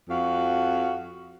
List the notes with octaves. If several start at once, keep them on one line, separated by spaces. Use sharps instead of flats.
F2 F#4 F5